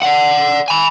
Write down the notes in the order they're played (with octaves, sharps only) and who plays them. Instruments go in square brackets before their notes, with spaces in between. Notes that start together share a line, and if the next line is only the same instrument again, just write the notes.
[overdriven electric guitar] D5 F#5
G#5 B5